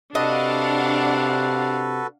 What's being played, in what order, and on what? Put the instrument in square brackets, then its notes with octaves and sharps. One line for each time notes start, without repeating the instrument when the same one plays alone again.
[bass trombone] C3 [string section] D4 F5 F#5 [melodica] F#4 A4 B4 [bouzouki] D#5